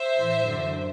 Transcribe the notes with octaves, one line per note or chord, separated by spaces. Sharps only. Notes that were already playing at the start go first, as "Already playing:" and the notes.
Already playing: C5 E5
A2 E3
F#2 D3